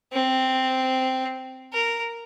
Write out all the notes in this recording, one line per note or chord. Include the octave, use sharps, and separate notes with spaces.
C4
A#4